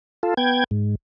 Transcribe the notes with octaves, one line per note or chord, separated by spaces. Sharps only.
F4 A4
B3 G5 G#6
G#2